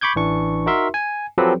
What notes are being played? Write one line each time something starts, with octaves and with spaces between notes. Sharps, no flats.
B5 C#6 D6 G6 G#6
A1 E3 D4 C#6
D#4 F#4 A#4 E5 C6
G#5
F3 F#3 C4 G4 A4 B4